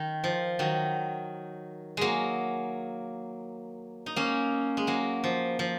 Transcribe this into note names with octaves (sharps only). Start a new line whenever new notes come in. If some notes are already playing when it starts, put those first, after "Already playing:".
Already playing: D#3
F3
D#3 F#3
F#3 G#3 A#3
D#4
A#3 C#4
G#3
F#3 A#3
F3
F3